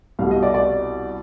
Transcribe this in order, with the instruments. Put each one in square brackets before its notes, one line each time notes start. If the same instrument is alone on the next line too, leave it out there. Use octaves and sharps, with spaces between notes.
[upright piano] C2 B2 G3 F5
D#5
D5
D5